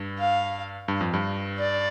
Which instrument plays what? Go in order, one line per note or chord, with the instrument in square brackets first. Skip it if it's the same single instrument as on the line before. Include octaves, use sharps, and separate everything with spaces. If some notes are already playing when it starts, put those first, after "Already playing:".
Already playing: [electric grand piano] G2
[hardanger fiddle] F5
[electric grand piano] G2
F2
G2
[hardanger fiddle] D5